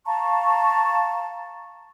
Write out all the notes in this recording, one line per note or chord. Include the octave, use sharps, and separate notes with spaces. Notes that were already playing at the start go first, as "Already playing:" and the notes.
F5 A5 A#5 C#6